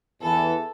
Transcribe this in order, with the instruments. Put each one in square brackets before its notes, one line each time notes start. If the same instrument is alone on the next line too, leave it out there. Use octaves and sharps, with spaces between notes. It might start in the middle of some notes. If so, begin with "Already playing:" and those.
[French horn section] E2 E3 [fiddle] A4